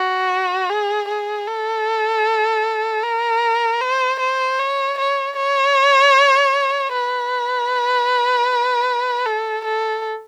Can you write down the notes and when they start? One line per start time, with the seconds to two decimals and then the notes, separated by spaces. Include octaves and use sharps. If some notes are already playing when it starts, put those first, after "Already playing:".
Already playing: F#4
0.70 G#4
1.08 G#4
1.48 A4
3.03 A#4
3.81 C5
4.20 C5
4.59 C#5
4.98 C#5
5.37 C#5
6.93 B4
9.26 A4
9.65 A4